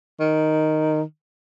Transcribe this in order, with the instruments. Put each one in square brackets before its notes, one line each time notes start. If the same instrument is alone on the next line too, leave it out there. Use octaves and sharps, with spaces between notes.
[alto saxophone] D#3